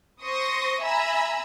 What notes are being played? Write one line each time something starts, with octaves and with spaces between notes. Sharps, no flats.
C5 C6 C#6 D#6 A#6
E5 G#5 A#5 B5 E6